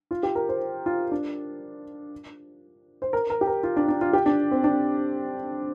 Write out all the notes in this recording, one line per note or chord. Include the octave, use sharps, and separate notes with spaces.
F4
G4
A#4
C5
F4
D4
C5
A#4
A#4
G4
A#4
F4
D4
D4
F4
G4
D4
C4
D4